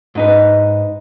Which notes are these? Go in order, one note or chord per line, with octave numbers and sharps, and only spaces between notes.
G#2 D#4 B4